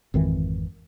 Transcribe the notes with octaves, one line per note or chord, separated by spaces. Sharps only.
G#1 F2 D#3 E3